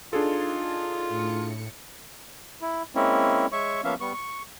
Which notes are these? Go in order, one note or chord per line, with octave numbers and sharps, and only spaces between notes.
D4 D#4 F4 G#4 A4
A2 C#7
E4
G#3 A#3 C4 C#4 E4
G#3 C#5 E5 C#6
F3 A#3 B3 C#4 E5 F5
G3 B3 C#6
C#6